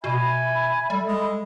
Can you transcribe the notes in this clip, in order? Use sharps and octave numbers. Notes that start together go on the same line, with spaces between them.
B2 E5 G#5 B5
G3 A4
G#3